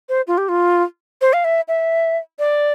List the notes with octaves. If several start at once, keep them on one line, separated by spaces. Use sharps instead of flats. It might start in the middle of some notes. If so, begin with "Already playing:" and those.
C5
F4
G4
F4
C5
F5
E5
E5
D5